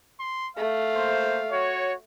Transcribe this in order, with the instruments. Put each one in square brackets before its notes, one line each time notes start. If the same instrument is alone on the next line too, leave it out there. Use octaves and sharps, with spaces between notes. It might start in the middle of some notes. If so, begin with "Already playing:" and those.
[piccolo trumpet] C6
[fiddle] A3 [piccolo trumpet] F5
[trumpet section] A#3 C5
F#4 C#5